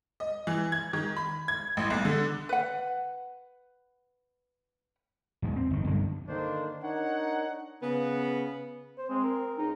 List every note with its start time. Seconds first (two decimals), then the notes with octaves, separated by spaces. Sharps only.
0.20 D#5
0.47 E3
0.72 G#6
0.93 D#3
1.17 B5
1.48 G#6
1.77 A1
1.90 B1
2.05 D3
2.49 B4 F#5
5.42 E2 G#2
5.56 C4
5.71 G1 D#3
5.85 B1 G2 D3 D#3
6.28 D3 D#3 A#3 D4 C5
6.83 D4 D#4 A#4 C#5 F#5
7.83 C#3 B3
8.98 C5
9.09 G#3 C4
9.24 A#4
9.59 C#2 D#4